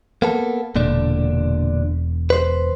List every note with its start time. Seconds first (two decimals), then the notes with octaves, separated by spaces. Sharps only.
0.22 A#3 B3 A4
0.76 E1 A#2 D3 D4
2.30 B4 C5